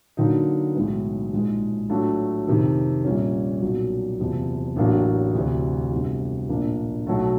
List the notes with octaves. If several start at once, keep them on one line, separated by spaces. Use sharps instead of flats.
D3 F#3 A#3 D#4
B1 A2 E3 G#3 B3
A#1 G#2 F3 G#3
A2 F#3 A3 D4 F4
F2 C3 D#3
A#1 A#2 G3 A#3 C#4
B1 A#2 F#3
F#1 E2 C3 F3
A1 A2 F#3 A#3 D4
D2 C3 E3
G1 F2 C3 E3
A#1 A2 F3 A#3 D4
B1 B2 F#3 A3